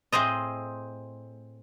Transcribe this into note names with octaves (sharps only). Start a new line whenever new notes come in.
A2 C4 G#4 C5 D#5